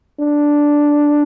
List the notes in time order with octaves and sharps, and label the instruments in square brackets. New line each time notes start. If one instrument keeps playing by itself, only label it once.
[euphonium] D4